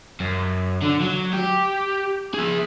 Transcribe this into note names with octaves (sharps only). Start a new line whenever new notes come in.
F#2
D3
F#3
G4
G#4 E5